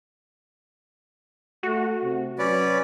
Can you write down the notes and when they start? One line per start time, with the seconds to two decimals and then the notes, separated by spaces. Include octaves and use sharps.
1.63 A3 F#4
2.03 C3
2.39 F#3 C#4 B4 D5